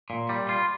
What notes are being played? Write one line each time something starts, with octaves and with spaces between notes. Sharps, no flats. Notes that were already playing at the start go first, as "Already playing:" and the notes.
A#2
G3
F4